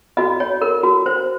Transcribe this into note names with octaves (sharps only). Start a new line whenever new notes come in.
F#4 D#5
C#5
A#4
F#4
C5